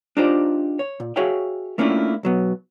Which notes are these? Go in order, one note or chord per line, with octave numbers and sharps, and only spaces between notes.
D4 D#4 F4 G4 C5 D5
C#5
A#2
F#4 G#4 C#5 E5 F5 G5
A3 A#3 C#4 D4 E4 F4
B1 F#3 B3